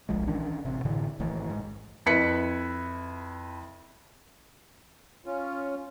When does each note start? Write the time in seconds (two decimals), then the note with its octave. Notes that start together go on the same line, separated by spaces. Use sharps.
0.09 D1 A#1 F3 G#3
0.27 D#3 E3 C#4 D4
0.65 A1 C3
0.85 A2 D3 E3
1.20 A1 A2 D#3 E3
1.50 G#2
2.06 F2 E4 B4 B6 C#7
5.26 C#4 F4